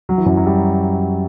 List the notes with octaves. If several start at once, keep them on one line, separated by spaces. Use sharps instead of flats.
F#3
E3
F#2 F#3
F#3
G3